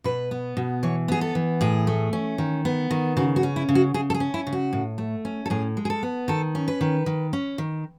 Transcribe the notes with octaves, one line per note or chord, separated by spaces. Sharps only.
B2 B4
B3
B2
E3 C#5
B3 G#4
A4
E3
A2 G#4
A3
C#4
D#3
B3
D#3
C#3 F#4
F#4
C#4
E4
C#3
F#4
C#3 G#4
A4
G#4
C#4
E4
C#3
F#4
A2
A3
C#4
A4
A2 G#4
G#3
G#4
A4
B3
D#3 A4
C#4
B4
D#3
D#3
C#4
D#3